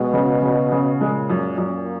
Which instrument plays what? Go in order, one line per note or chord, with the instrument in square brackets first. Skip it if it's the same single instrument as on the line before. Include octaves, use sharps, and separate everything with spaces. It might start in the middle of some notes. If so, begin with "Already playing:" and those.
Already playing: [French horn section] B2 [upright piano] G#3
[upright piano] C#3
C#3
C#3
[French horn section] A#2 [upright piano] G#3
[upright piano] F#2
F#2